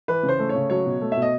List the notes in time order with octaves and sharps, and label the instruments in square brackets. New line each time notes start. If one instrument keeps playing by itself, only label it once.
[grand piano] E3 B4
C#3
C5
A3
C#5
C#3
F#3 C#5
B2
A3
B2 E5
D#5